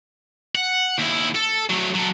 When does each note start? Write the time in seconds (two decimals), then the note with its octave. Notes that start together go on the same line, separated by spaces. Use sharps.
0.55 F#5
0.98 D#2 E4
1.35 A4
1.70 F#3 A3
1.95 F#3 A4